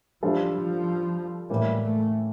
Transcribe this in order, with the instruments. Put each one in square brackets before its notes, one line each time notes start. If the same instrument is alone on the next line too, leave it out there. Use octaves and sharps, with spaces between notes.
[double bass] F3 [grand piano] G3 D4 A4 C5 F5
[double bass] F3
[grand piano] A2 E3 A#3 [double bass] G3
[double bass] A3